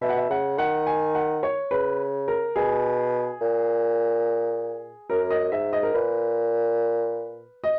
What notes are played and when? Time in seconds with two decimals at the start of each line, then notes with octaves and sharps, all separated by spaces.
0.01 B2 E5
0.09 F#5
0.16 E5
0.30 C#3 F#5
0.58 D#3 F#5
0.87 G#5
1.15 F#5
1.43 C#5
1.71 C#3 B4
2.28 A#4
2.56 B2 G#4
3.41 A#2
5.10 F#2 A#4
5.31 D#5
5.52 G#2 E5
5.73 D#5
5.83 A#4
5.94 A#2 B4
7.64 D#5